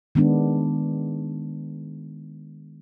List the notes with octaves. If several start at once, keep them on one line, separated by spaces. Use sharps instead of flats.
D#3 G#3 B3 D4